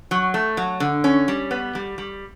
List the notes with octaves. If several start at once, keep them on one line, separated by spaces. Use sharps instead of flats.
F#3
A3
F#3
D3
C#4
G3
B3
G3
G3